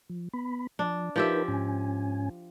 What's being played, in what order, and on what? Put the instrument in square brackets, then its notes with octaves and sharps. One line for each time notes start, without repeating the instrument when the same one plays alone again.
[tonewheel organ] F3
B3 B5
[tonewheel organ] F3 [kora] D4
[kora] F3 G4 E5 [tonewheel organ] D#4 A#4 B4
[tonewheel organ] G#2 C#4 G#5